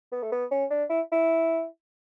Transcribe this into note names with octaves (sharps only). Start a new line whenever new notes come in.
B3
A3
B3
C#4
D4
E4
E4